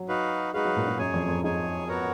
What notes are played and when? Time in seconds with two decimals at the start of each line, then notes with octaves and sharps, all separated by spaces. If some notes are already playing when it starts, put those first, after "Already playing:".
Already playing: F#3
0.09 D#4 F#4 B4 F5
0.54 G#3 D#4 F#4 B4 F5
0.65 F#3
0.76 A#2
0.87 G#2
0.98 F#2 G#4 C#5 G#5
1.14 F2
1.28 F2
1.44 G#2 G#4 C#5 G#5
1.88 B3 F#4 A#4 C#5